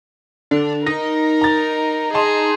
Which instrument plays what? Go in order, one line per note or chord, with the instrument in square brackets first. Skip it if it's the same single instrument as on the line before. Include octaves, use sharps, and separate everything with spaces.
[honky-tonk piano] D3 [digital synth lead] D4
[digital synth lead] D#4 [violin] A#4 [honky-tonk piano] A#6
[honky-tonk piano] A#5 A6
[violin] G#4 [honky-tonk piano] D#5 A5 C6